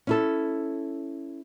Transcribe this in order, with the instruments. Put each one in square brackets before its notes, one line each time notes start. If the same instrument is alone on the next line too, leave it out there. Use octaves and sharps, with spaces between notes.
[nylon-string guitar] C#4 E4 A4